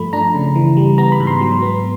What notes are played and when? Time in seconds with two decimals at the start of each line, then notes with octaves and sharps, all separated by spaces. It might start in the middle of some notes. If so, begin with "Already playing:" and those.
Already playing: G2 F3 A3 B5
0.13 D4 A#5
0.35 C#3
0.56 E3
0.77 G3
0.98 B3 A#5
1.12 B5
1.20 G#2
1.27 C6
1.41 F#3
1.62 B3